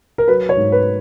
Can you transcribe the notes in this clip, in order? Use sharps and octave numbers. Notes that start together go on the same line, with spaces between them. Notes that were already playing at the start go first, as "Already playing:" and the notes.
A#4
F#3 B4
C#5
G#2
B4